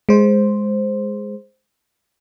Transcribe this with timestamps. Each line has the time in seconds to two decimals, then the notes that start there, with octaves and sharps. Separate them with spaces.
0.09 G#3 C5